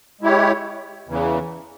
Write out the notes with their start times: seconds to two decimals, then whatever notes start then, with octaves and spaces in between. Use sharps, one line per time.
0.21 G#3 E4 G4 C#5
1.08 E2 C#3 E3